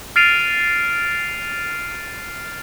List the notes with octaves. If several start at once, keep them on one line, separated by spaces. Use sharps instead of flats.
F6 A6 C7 D7 D#7 F7